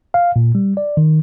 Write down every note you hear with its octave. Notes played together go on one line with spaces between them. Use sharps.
F5
A#2
G3
D5
D#3